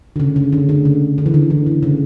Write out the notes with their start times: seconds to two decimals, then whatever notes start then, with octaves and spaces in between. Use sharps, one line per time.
0.16 D3
0.20 C#3
0.36 C#3
0.53 D3
0.69 D3
0.85 C#3
1.18 D3
1.26 E3
1.34 D3
1.50 E3
1.66 D3
1.83 C#3